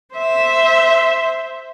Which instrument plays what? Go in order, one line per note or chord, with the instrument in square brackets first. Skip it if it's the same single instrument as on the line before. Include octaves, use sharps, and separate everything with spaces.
[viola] C5 E5